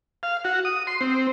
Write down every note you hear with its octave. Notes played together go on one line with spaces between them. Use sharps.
F5
F#4
D#6
C6
C4